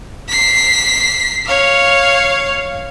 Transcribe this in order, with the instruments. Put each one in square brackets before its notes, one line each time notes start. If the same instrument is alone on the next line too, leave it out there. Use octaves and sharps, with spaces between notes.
[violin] B6 C7
C#5 F5